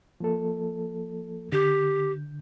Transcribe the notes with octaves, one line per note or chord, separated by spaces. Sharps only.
F3 A#3 A4
D3 G4 G6